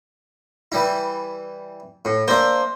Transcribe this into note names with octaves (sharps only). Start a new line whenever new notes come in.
E3 G3 E4
A2
A#3 D4 C5 E5